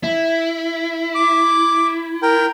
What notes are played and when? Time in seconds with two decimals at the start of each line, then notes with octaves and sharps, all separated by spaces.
0.03 E4
1.15 D6
2.22 A#4 G5